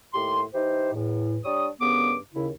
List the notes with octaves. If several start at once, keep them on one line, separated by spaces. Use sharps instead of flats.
D#2 A2 G4 C6
E3 D#4 G4 C5
E2 A2
G3 D4 C#5 D#6
C2 G2 C#3 B3 D6
D#2 C#3 E4